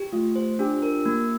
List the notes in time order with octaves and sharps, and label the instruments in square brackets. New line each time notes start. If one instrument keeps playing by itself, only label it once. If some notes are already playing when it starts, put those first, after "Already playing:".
Already playing: [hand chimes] G4
[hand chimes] A3 [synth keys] F4
[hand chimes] C5
[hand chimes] D4 [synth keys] G4
[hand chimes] A#4
A#3